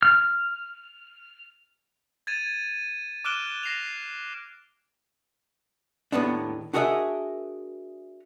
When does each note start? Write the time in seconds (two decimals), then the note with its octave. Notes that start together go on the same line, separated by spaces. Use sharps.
0.03 F6
2.27 G#6 A6 D#7 E7
3.25 D6 F6 F#6 D7 E7 G7
3.63 A#6 C7 E7 F7
6.12 D#2 A2 B3 D4
6.73 D4 F#4 G#4 A#4 D#5 E5